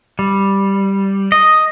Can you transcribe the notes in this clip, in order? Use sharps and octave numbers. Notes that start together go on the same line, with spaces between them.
G3
D#5